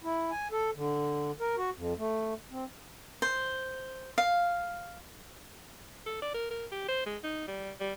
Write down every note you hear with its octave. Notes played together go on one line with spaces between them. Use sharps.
E4
G#5
A4
D3
A#4
F#4
F2
A3
C4
C5
F5
A4
D5
A#4
A#4
G4
C5
G#3
D#4
G3
G3